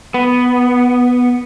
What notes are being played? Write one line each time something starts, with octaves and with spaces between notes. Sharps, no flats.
B3